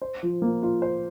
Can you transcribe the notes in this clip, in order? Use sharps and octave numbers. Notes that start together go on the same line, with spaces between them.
C5
F3
A#3
F4
C5